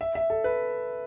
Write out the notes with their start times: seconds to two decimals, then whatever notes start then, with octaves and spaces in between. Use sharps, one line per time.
0.01 E5
0.15 E5
0.30 A4
0.44 B4